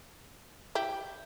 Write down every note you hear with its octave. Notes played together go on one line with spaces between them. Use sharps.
E4 G4